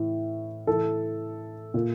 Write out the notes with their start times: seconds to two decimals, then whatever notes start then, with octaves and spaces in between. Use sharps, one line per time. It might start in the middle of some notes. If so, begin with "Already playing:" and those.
Already playing: A2 E3
0.67 A2 E3 A4
1.74 A#2